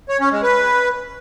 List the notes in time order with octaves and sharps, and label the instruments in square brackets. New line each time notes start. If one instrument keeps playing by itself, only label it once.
[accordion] C#5
C#4
G#3
B4